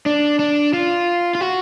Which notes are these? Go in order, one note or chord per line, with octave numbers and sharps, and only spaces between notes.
D4
D4
F4
F4
F#4